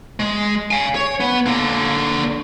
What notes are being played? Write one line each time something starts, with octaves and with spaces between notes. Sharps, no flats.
G#3
F5 G#5
C#5
B3
D3 A#3